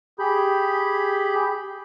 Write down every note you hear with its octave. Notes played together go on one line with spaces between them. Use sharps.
G4 G#4 B5 G6